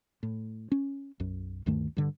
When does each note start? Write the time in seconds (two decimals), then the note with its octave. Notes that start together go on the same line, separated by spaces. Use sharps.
0.23 A2
0.72 C#4
1.20 B1 F#2
1.66 D2 G2 D#3 A3
1.97 G2 D3